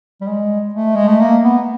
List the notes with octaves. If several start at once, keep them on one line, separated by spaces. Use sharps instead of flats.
G3
G#3
A3
G#3
A3
A#3
B3